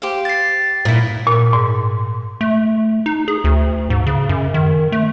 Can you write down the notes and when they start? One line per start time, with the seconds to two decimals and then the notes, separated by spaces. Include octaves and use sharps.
0.02 G4 C5 F5
0.25 A6 C7
0.85 A#2 E4
1.27 A#2
1.53 G#2
2.41 A3
3.06 D#4
3.28 G#4
3.44 D2
3.90 G#2
4.07 C#3
4.29 F#2
4.54 D#3
4.92 A3